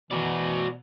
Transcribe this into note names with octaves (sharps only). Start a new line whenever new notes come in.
B2 E3 F#4 D5